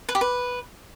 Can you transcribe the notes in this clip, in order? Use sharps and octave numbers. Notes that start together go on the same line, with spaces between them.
B4
G4
B4